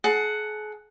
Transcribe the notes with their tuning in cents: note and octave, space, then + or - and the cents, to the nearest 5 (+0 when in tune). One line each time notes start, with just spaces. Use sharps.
G#4 +40 F#5 +5 A5 +20